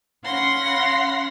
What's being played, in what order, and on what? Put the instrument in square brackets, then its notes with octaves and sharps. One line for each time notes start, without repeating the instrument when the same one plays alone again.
[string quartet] C#4 F5 F#5 B5 C6 A#6